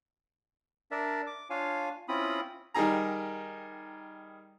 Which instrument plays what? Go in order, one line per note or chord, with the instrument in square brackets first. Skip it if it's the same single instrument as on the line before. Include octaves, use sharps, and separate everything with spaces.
[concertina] D4 A#4 D5 E5
D6
D4 F4 C#5 F5 G#5
C4 C#4 E4 F4 B5 D#6
[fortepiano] D#3 G3 D#4 G#4 A#5